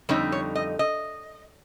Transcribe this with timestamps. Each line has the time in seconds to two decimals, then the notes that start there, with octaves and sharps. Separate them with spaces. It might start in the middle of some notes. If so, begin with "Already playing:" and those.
0.09 F2 D3 G3 D#4 C#5
0.32 C#5
0.56 D#5
0.79 D#5